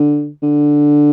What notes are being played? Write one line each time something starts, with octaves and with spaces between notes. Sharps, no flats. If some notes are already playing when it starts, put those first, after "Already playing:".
Already playing: D3
D3